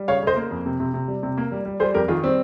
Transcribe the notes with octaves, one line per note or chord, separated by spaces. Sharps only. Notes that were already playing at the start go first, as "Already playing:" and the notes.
Already playing: G3
C#3 C#5 F5
C#3 C5 D#5
A#3
F2
C3
C3
C3
G3
C3
A#3
G3
G3
G3 G#4 C5
F2 G4 A#4
D#3 F4 G#4
G3 C4